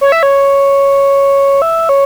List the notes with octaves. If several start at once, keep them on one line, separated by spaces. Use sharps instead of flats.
C#5
E5
C#5
E5
C#5